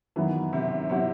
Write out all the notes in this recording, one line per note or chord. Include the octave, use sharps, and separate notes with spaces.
F#2 D#3 E3 F#3 B3
C3
C3 F#3 B3 E4 G4